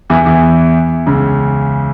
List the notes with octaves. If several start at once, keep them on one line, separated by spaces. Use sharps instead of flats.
E2 E3
E2 E3
C#2 C#3